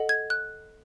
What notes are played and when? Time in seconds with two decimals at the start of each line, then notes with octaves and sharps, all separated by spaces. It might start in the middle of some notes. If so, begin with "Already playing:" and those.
Already playing: A4 D#5 F#5
0.09 G#6
0.30 F#6